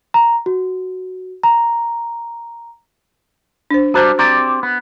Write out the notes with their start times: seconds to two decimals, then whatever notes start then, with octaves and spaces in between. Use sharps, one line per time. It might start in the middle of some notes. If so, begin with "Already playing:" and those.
0.14 A#5
0.46 F#4
1.43 A#5
3.71 D4 C5
3.94 G3 D4 F#4 C5 A#5
4.19 C4 G4 D5 A#5
4.63 B3